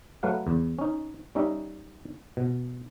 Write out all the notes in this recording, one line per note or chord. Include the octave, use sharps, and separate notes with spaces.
F#3 A3 B4 F5 F#5
E2
C#4 D#4
G3 C#4 D#4 D#5 E5
B2